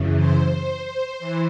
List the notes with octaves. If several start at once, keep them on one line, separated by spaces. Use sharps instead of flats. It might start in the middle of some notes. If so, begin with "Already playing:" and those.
Already playing: F#2 C#3 E3
C5
E3